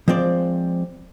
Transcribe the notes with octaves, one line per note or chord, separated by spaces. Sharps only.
F3 G#3 C4 D5